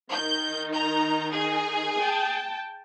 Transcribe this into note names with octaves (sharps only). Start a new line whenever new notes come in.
D#3 D#4 G6
A#5 G6
G#4
G5 A5